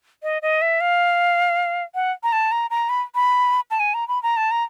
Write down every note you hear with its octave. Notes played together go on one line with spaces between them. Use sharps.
D#5
D#5
E5
F5
F#5
A#5
A5
A#5
A#5
B5
B5
A5
G#5
A#5
B5
A#5
A5
A#5